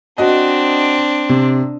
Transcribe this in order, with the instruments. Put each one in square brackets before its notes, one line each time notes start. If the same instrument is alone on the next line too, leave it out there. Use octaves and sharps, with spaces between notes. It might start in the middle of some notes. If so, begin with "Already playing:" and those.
[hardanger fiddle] C4 D4 [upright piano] F#4 D#5
[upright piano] C3